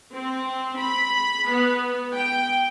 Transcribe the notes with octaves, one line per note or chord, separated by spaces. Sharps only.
C4
B5
B3
G5